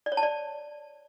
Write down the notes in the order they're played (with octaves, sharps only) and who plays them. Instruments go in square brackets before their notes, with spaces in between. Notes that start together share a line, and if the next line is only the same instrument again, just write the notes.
[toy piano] D5
C#5
A5
D5